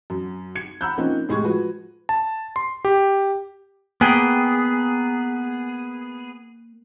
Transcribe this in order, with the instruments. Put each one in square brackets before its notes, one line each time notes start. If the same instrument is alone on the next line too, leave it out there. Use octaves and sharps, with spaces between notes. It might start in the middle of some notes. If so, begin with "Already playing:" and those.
[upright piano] F#2
G#6 C#7
F#5 A#5 B5 E6 F#6 G6
F3 A#3 C4 C#4 D#4
A2 G#3 G4 C#6 G#6
F3 F#4 B4
[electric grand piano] A5
C6
G4
[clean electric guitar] A#3 G5 [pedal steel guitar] B3 G#4